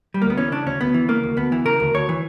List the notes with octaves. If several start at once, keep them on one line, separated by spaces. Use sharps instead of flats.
G3
D2 A#3
B3
E3 C#4
C#3 D4
D2 C#4
D2 B3
E3
C#3 A#3
D2
D2 B3
E3
C#3 A#4
D2
D2 C#5
E3